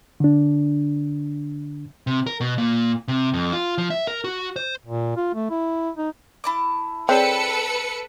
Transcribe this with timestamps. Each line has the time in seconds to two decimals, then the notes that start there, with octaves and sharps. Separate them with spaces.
0.20 D3 D4
2.07 C3
2.27 A#4
2.41 B2
2.58 A#2
3.08 C3
3.33 F2
3.53 F4
3.78 F3
3.90 E5
4.07 A#4
4.24 F#4
4.56 C5
4.86 A#2
5.16 F4
5.34 A3
5.50 E4
5.97 D#4
6.44 E4 A5 D6
7.09 C4 G#4 A4 B4 C#5 D5 C#7